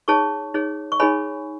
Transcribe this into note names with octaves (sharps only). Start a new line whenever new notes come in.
D#4 G#4 C#5 A5 C#6
D#4 G#4 C#5
C#6
D#4 G#4 C#5 G#5 B5